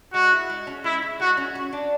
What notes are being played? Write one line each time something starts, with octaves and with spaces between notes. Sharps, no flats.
G#3 F#4
E4
G#3
C#4
G#3 E4
E4
G#3 F#4
C#4
F#4
D4